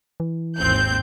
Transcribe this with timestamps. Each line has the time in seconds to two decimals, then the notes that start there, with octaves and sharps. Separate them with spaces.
0.20 E3
0.58 G#1 D#2 C4 G6